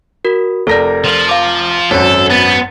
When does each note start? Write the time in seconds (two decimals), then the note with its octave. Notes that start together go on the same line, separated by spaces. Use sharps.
0.25 F#4 A#4
0.67 F1 A4 A#4 D5 A#6
1.04 F3
1.29 F5 D6
1.91 G#1 F#2 A4 C#5
2.30 B3 A6